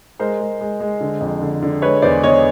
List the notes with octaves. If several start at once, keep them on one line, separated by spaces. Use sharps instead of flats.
G#3 A#4 C5
G#3
G#3
G#3
D3
F2
D3
D3
G#3 B4 C#5
E2 C5 D5
E2 C#5 D#5